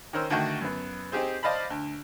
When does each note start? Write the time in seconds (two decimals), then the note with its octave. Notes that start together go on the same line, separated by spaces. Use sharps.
0.13 D#3 C#4 A#4 C5 E6
0.30 D3 D#3 A3 F#4 G5
0.61 F#2 B3
1.12 C4 D#4 G4 G#4 C5
1.43 C5 D5 D#5 F5 A5 B5
1.70 D2